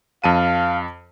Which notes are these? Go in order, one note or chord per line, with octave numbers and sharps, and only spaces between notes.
F2 F5 A5 D#7